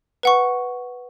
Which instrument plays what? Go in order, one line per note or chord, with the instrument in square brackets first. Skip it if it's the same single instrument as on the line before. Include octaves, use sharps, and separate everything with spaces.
[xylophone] B4 F#5 C#6